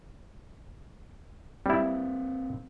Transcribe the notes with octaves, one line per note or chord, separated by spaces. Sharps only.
G3 A#3 C4 E4